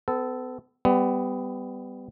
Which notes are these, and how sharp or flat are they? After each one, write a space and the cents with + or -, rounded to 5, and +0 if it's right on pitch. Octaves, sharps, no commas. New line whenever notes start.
B3 +40 A4 -5
G3 +10 B3 +25